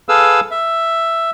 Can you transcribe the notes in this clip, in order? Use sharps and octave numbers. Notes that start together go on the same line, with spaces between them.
G#4 A4 B4 F5 E6
E5